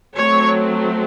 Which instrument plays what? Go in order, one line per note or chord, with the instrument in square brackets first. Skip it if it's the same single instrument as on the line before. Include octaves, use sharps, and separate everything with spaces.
[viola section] F#3 A3 C4 C#5